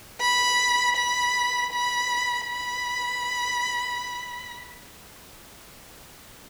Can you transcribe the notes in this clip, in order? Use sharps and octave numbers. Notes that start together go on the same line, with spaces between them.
B5
B5
B5
B5